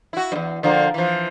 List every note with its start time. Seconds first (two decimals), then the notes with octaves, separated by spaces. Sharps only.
0.13 E4 F#4
0.32 E2 G2
0.63 D3 F3 A#3
0.94 E3 F3